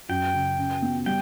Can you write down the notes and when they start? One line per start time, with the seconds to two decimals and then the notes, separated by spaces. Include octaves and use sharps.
0.09 F#2 G5
0.34 C#3
0.58 C#3
0.82 B3
1.06 G3 G5